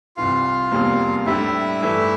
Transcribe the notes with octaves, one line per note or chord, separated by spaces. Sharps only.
C2 C3 E3 F4 F5
F1 E2 C3 G3 A#3
A2 G3 D4 E4 G4 E5
G2 E3 A3